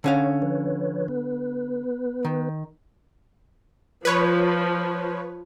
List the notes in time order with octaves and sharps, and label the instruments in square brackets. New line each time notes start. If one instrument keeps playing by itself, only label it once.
[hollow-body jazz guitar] D3 C#4 F5 [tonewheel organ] C#5
[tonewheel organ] F3 B4 C#5
B3 B4
[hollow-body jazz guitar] D#3
[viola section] F3 [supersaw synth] B4 C#5